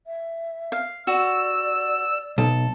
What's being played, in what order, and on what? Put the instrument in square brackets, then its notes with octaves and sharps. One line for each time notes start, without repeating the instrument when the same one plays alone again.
[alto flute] E5
[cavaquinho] F5
[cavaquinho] F#4 [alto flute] D5 [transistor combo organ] E6
[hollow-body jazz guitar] B1 [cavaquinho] A4